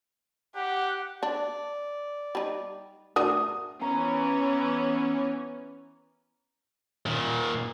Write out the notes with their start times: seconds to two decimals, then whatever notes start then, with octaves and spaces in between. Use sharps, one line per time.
0.56 G4 F#5
1.23 D4 D5
2.35 G3 D#4
3.16 A3 D4 F#4 A#4 D#6
3.81 E3 B3 C#4 A#5
7.06 A#2 D#3